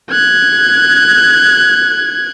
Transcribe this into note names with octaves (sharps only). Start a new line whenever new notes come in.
F#6 G#6